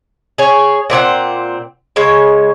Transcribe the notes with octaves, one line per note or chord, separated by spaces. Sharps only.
G#4 C#5
A#2 C4 G#4 F#5
C#3 G#3 C#5